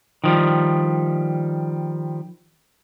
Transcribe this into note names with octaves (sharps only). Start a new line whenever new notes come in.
D#3 F3 G3